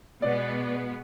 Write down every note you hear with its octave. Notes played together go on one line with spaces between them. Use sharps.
B2 G#3 B3 D5